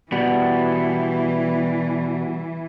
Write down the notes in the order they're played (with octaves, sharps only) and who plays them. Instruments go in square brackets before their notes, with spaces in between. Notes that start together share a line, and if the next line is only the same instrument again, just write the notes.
[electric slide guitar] B2 G3 B3 [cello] E3